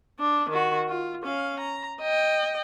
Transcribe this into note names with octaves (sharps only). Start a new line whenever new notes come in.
D4
D#3 F#4
F4
C#4 F5
A#5
D#5 G5